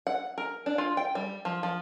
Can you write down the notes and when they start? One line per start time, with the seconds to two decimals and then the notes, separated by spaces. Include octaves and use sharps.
0.07 F#5
0.38 A#4
0.66 D4
0.78 F4
0.97 G5
1.15 G3
1.45 F3
1.63 F3